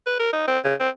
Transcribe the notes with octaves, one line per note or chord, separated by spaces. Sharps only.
B4
A#4
D#4
C4
C#3
C4